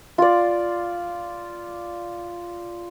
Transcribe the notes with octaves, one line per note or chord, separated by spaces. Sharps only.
F4 D5